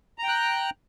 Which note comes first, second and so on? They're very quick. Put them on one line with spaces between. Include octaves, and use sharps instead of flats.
A#5 G5 F#6